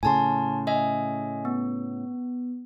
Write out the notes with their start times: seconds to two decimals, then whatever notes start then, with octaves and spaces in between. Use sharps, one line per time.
0.03 A2 C#3 G#5 A5 C6
0.67 D#5 E5 G#5
1.45 B3